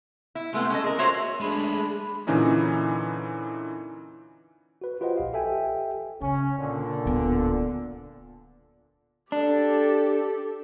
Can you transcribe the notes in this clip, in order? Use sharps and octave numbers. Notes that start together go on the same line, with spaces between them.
E4
C3 G#3 A3 B3 C4
C#4 A4 D#5
G#4 A#4
F4 F#4 A#4 C5 C#5 E5
G#3 A3 D4 G#4 B5
A#2 D3 E3 C#4 D#4 E4
F#4 B4
F4 G4 B4 C5 D#5 F#5
A#1 F5
G4 A4 E5 G5 G#5
C#3 C#4
A#2 D3
D1 B3
D4 G4 A4